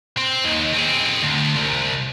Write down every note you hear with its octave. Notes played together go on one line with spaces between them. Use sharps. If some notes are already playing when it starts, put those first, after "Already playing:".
C4
D#2 D#3
C4 G#4
D2
C2